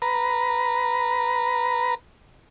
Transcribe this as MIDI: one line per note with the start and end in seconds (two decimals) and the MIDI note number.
0.02 1.95 71
0.02 1.95 82